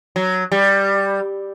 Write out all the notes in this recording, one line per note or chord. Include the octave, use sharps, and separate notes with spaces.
F#3
G3